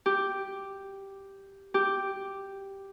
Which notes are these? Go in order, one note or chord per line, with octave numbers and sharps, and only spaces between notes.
G4
G4